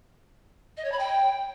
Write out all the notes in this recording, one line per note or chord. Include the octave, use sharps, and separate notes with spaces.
D#5
C#5
B5
G5